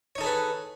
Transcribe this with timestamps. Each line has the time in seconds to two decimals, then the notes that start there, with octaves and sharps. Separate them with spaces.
0.15 C#5
0.18 D#4
0.21 A4
0.23 G#4
0.26 B4